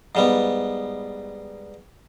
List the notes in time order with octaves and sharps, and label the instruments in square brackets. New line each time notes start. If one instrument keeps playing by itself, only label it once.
[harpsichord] G#2 G3 B3